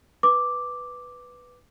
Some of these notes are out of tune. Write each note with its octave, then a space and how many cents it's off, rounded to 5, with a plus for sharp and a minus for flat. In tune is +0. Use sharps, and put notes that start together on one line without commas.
B4 +0 D6 +0